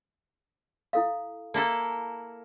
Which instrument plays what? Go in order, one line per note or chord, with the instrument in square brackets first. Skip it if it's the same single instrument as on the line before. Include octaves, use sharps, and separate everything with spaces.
[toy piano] E4 A4 F5
[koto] A#3 E4 A4 [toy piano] A5